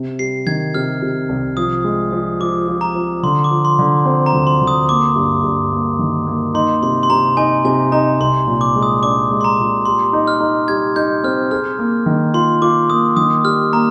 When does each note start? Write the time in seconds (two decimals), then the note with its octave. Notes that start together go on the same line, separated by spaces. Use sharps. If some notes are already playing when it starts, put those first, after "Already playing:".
Already playing: C3
0.19 G3 C7
0.47 D#3 G#6
0.75 C3 F6
1.02 C3
1.29 C2
1.57 F3 D#6
1.84 G#3
2.12 F3
2.40 F3 D6
2.68 F3
2.81 A#5
2.95 F3
3.23 D3 C6
3.44 D6
3.51 F3
3.65 C6
3.79 D3
4.05 C4
4.26 A#5
4.33 D2
4.47 C6
4.61 D2
4.67 D#6
4.89 A#3 D6
5.16 G2
5.44 G2
5.72 A#3
5.99 D#3
6.27 A#3
6.54 D#4 C6
6.82 C3 C6
7.03 C6
7.10 C3 A#5
7.37 D#4 G#5
7.65 C3 G#5
7.92 D#4 A#5
8.20 C2 C6
8.47 A#2
8.61 D6
8.75 G#3
8.83 D#6
9.03 D4 D6
9.31 G#3
9.41 C6
9.44 A#5
9.59 A#2
9.85 G3 C6
10.13 D#4
10.28 F6
10.40 D#4
10.68 G3 G#6
10.96 D#4 G6
11.24 C4 F6
11.51 G#4 F6
11.79 A#3
12.06 D#3
12.34 F4 C6
12.62 F4 D6
12.90 A#3 D#6
13.17 D#3 D#6
13.44 G3 F6
13.73 A#3 A#5